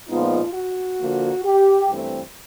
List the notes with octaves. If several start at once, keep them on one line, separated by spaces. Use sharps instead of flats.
A#2 F3 G#3 B3 D#4 F4
F#4
D3 F3 A#3
G4
G2 E3 A3 C4